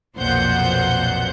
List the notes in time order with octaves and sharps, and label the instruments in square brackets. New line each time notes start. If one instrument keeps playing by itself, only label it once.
[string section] B1 F2 A#2 C5 F#5 G6